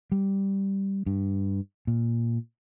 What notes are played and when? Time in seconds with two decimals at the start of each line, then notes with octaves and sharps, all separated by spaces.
0.12 G3
1.06 G2
1.87 A#2